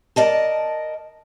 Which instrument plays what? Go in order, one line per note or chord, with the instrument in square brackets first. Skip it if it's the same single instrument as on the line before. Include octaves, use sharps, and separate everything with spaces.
[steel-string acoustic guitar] A#4 D5 D#5 A5